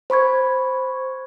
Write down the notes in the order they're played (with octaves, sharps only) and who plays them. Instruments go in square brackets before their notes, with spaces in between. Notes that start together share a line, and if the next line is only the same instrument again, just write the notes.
[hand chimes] C5 B5 C#6 G#6